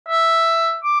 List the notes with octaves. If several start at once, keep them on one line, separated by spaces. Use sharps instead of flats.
E5
D6